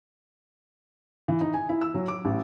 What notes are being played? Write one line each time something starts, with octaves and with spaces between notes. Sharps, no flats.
E3
D#4
G#5
E4
E6
F#3
D6
A1